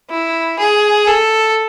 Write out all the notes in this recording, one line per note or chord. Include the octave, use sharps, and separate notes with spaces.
E4
G#4
A4